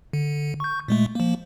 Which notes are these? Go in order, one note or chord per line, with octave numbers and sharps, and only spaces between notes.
D3
C#6 G6
A#2 G#3 A3
F3 A#3